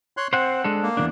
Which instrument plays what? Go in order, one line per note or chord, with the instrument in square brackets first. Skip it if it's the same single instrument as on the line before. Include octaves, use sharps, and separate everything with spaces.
[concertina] C#5 C6 F#6
[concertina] C4 [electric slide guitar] C5 F#5
[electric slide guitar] G#3 D4 A4
[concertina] A#3
[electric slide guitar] E2 E3 D4